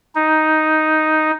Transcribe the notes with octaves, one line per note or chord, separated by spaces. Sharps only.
D#4